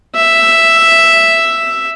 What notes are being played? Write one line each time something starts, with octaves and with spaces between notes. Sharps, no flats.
E5